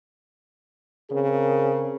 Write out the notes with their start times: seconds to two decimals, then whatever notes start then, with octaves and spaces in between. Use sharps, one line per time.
1.11 C#3 C4 G#4 A#4